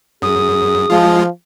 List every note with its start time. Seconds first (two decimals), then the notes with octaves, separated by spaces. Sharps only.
0.22 F#2 G#4 D#6
0.90 F3 G#3 F4